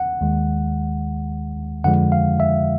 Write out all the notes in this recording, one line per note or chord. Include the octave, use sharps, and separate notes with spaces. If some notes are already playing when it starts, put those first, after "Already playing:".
Already playing: F#5
D#2 D#3 G#3
F2 D3 F3 G#3 F#5
F5
E5